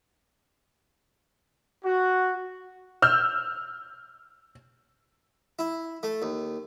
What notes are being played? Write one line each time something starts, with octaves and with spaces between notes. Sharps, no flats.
F#4
E6 F6 G6
E4
A3
D#2